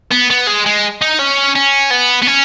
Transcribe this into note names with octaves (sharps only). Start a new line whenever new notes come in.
B3
B3
G#3
G#3
D#4
C#4
C#4
B3
B3
C#4